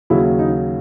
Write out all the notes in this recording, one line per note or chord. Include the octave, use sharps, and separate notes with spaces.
D#2 C#3 F#3 E4
D#4